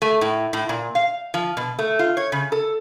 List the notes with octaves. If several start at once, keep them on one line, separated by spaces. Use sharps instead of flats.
A3
A2
A2
A#2
F5
F3
B2
A3
F4
C#5
C#3
A4